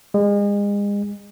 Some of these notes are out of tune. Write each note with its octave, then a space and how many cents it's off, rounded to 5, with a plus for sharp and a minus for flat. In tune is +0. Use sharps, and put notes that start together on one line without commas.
G#3 -35